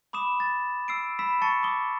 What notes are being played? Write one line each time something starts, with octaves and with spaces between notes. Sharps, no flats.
B5 D6 D#6 E7
A6
E6 C7 D7
B5 E6 B6 E7
A5 C#6 A6 C#7
D6 D#6 G7